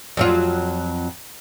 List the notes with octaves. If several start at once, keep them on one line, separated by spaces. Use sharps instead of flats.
F2 F#3 F4